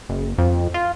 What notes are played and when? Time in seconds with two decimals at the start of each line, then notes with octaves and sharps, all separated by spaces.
0.09 F#1
0.38 F2
0.74 F4